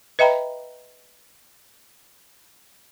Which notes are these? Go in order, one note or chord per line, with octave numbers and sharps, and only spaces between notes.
B4 D#5 E5 G5 A#5 B5